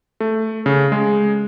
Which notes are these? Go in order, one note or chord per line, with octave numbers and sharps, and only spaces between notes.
A3
C#3
G#3